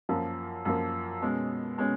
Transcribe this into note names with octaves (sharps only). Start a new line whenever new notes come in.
F#2 F3 A#3
F#2 F3 A#3
B2 G#3 C#4
B2 G#3 C#4